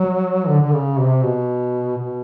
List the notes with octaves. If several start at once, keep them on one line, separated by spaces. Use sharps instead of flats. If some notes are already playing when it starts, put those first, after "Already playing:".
Already playing: F#3
D3
D3
C#3
C3
B2
B2